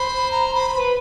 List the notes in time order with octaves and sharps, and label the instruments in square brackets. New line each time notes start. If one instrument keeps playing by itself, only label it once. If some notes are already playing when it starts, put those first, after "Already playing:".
Already playing: [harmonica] C5 [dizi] B5
[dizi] A#5
B5
[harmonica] B4